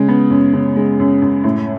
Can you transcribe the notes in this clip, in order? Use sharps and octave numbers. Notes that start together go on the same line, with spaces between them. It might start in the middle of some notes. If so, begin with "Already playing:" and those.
Already playing: C#3 G#3
B3
F#2
C#3
G#3
F#2
F#2
A2